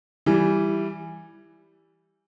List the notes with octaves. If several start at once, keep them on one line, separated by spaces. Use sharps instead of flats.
E3 G3